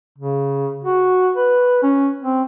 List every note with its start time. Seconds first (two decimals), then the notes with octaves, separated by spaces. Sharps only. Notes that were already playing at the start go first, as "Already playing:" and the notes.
0.19 C#3
0.84 F#4
1.36 B4
1.83 C#4
2.23 C4